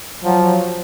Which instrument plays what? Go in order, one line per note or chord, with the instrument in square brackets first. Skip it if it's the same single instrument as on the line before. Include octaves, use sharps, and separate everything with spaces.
[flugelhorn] F3 [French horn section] F#3